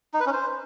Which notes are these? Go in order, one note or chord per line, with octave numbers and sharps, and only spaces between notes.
D#4
B4
C#4
C5